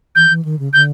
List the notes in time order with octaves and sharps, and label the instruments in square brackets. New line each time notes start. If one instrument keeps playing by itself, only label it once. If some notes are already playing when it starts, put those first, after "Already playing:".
[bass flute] E3 [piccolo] G6
[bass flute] E3
D#3
C#3
[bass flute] D3 [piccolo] G6